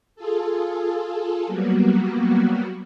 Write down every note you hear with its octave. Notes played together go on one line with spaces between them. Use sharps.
F4 G#4 A4
F#3 G3 A#3 B3 F#4